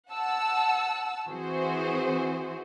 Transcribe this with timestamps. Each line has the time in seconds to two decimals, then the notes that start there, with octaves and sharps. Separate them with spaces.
0.11 F#5 A5 E6
1.29 E3 C4 F#4 G#4 C5